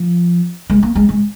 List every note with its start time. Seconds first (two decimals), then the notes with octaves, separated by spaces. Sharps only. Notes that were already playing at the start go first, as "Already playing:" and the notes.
Already playing: F3
0.70 G#3
0.83 A#3
0.95 G#3
1.09 G#3